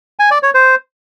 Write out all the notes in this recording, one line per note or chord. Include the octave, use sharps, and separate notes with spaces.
G#5
D5
C#5
C5